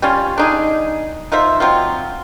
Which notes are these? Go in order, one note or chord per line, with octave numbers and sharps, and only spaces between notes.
G3 C#4 F4
D4 D#4 G#4
D#4 F4 C5 E5
F3 F#3 C4 F4